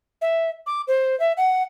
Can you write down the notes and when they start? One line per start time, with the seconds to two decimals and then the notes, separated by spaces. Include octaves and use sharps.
0.22 E5
0.66 D6
0.88 C5
1.20 E5
1.37 F#5